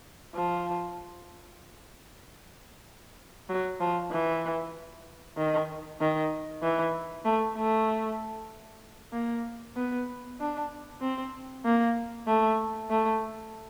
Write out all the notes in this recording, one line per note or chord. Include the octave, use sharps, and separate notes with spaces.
F3
F#3
F3
E3
D#3
D#3
E3
A3
A3
A#3
B3
D4
C4
A#3
A3
A3